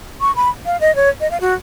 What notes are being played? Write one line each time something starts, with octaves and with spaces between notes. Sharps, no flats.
C#6
B5
F5
D#5
C#5
D#5
F5
F#4